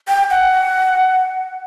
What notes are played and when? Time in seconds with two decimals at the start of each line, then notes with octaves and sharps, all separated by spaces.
0.08 G5
0.30 F#5